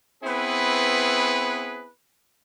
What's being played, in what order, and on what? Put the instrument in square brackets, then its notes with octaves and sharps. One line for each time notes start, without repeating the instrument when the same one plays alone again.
[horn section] B3 C4 E4 G#4 B4